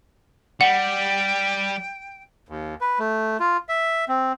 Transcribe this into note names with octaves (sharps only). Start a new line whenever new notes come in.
G3 F#5 G5
D#2
B4
A3
F4
E5
C4